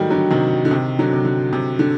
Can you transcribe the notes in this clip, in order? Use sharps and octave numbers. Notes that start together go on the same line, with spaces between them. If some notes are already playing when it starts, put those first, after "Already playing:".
Already playing: D#3 F#3 G3 A3
D3 F#3
C3 D#3
D3
C3 D#3
D3 F#3
C3
D3
C3
D3